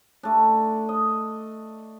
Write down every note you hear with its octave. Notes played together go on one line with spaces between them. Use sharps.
A3 D4
D#5